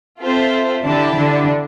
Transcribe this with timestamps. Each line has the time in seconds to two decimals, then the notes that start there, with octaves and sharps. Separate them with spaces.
0.20 C4 F4 A4 C5 E5
0.83 D3 D4 E4 G4 D5 A5
1.14 D3 D4